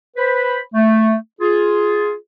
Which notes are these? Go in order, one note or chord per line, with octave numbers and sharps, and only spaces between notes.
B4 C5 B5
A3
F4 G#4